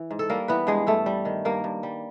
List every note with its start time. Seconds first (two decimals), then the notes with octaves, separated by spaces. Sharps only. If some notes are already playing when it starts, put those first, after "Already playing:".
Already playing: E3
0.11 G#2
0.19 A4
0.30 G3 A#3 A#4
0.48 E3 B3 B4
0.67 G2 G#3 G#4
0.87 G2 A3 A4
1.06 G3
1.25 D#3
1.45 G2 A#3 A#4
1.64 G2
1.83 G3